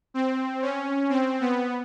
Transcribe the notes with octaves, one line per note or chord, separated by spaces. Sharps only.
C4
C#4
C4
B3